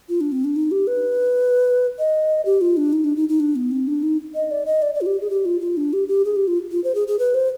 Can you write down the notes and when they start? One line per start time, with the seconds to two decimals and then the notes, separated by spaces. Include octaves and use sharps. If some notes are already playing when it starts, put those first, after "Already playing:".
0.09 F4
0.21 D4
0.32 C4
0.44 D4
0.56 D#4
0.71 G4
0.87 B4
1.98 D#5
2.45 G4
2.61 F4
2.77 D4
2.93 D#4
3.04 D4
3.16 D#4
3.29 D#4
3.40 D4
3.56 B3
3.71 C4
3.87 D4
4.03 D#4
4.35 D#5
4.51 D5
4.66 D#5
4.82 D5
4.95 D5
5.01 F4
5.06 G4
5.21 G#4
5.30 G4
5.45 F4
5.61 F4
5.77 D4
5.93 G4
6.08 G4
6.25 G#4
6.36 G4
6.47 F4
6.72 F4
6.84 C5
6.95 G#4
7.08 G#4
7.19 B4
7.34 C5